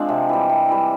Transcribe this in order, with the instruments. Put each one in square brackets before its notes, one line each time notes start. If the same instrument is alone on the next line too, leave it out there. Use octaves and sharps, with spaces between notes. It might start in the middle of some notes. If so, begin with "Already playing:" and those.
Already playing: [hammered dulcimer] F3 G#3 C4 D4
C3
E3 G3
C3
E3 G3